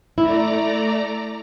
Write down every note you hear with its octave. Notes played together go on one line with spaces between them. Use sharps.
A3 E4 D5 A#5